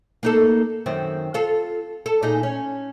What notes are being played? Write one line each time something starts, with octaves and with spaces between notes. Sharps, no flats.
A#3 D#4 A4
F#2 D#3 C4
F4 A4
A4
A#2 D#4 G#4
C#4